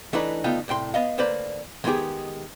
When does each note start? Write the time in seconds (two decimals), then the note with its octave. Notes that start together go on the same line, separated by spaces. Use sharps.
0.13 E3 A3 D4 D#4 B4
0.44 D2 B3 D#4 F4 A4 G5
0.68 C2 A2 G5 C6
0.94 B3 D#5 F5
1.18 D2 A#3 B4 C5 D5 B5
1.84 D#3 G#3 B3 F4 G4 G#4